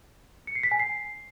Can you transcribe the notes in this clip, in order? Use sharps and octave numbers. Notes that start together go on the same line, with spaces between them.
C#7
C7
B6
G#5
C7